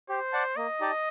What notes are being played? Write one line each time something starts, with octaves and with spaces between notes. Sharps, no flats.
G4 C5
D5 F#5 A5
A#3 D#5
D#4 G4 D5 A5